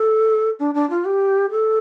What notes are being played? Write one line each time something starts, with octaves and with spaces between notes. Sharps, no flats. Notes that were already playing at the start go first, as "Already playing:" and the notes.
Already playing: A4
D4
D4
F4
G4
A4